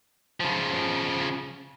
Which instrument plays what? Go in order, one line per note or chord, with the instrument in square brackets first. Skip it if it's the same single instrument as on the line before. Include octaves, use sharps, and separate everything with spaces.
[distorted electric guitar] C#3 F3